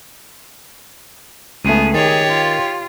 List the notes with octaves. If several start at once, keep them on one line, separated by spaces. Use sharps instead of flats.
C#2 A3 B3 G#4 D#7
D#3 G4 G#4 C#5 A6
F4